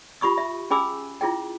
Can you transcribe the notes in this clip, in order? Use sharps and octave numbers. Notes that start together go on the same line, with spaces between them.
F4 G4 B5 C#6 D#6
E5
C#4 G#4 G#5 B5 D6 E6
E4 F4 G#4 G5